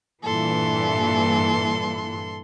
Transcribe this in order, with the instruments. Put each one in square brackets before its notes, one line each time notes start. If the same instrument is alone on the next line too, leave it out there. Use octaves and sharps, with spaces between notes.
[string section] G2 A#2 E3 [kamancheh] A4 C6